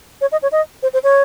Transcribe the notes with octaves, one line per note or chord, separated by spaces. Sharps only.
C#5
D#5
C#5
D#5
C5
C5
C#5